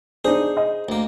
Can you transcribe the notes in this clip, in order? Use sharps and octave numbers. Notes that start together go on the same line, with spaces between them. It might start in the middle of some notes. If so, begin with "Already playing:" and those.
D4 D#4 G#4 C5
D#5
D2 A#3